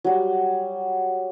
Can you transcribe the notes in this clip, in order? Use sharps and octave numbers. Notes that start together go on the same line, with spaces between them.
F#3 G3